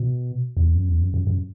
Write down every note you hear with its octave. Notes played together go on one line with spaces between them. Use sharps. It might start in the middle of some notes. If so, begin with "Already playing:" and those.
Already playing: B2
E2
F#2
E2
F#2
F#2
F#2